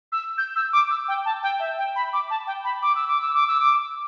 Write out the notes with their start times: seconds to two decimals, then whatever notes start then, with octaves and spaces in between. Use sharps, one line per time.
0.12 E6
0.38 G6
0.56 E6
0.73 D6
0.91 E6
1.08 G5
1.25 A5
1.43 G5
1.60 E5
1.78 G5
1.96 B5
2.13 D6
2.30 A5
2.47 G5
2.64 B5
2.82 D6
2.95 E6
3.08 D6
3.21 E6
3.34 D6
3.47 E6
3.60 D6